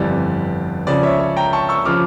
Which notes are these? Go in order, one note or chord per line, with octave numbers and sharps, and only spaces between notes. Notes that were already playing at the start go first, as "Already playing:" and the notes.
Already playing: G1 F2 E3 G3 D5
C#2 C#3 F3 D5
C#5 E5
C#5
G5 A#5
A5 C#6
C#6 E6
C#3 F3 D6 F6